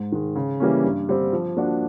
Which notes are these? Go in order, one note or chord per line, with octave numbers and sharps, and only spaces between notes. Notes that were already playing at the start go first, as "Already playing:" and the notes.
Already playing: G#2
D#3 G#3
C#3
E3 G3 A#3 C#4
G2
D3 G3 C4
F3
A#3 D4 F#4